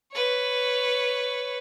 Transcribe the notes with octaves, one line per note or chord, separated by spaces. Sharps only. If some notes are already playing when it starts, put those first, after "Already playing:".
B4 C#5